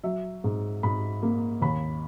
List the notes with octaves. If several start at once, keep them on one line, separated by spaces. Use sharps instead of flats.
F#3 E5
G#2
G#2 B5
A#3
D#2 B5